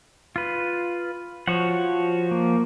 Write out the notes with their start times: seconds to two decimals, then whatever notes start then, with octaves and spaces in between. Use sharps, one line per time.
0.36 F4 B4
1.48 F3 F#4 C#5 F#5
2.31 A#3